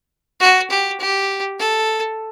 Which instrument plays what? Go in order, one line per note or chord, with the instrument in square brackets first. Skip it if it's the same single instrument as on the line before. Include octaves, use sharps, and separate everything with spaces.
[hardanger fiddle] F#4
G4
G4
A4